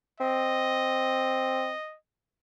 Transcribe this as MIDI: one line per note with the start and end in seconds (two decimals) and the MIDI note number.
0.20 1.72 60
0.20 1.97 75